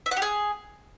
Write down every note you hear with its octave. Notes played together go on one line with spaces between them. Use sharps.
E5
F#5
G4
G#4